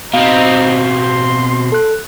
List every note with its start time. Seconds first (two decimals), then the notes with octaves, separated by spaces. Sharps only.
0.14 B2 C4 D#4 F5
0.86 C6
1.72 A4 F#6